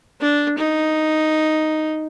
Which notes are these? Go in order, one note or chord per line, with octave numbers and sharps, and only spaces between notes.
D4
D#4